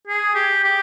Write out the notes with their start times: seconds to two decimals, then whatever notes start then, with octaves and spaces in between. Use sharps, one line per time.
0.08 G#4
0.35 G4
0.64 G4